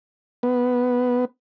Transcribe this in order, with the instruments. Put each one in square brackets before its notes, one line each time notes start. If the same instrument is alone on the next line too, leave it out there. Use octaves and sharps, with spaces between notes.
[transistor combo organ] B3